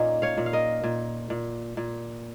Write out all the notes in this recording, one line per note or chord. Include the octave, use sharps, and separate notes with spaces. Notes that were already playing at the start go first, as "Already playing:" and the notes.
Already playing: A#2 A#3 C#4 D#4
C#5 F5
A#2
F5
A#4 D#5
A#2
A#2
A#2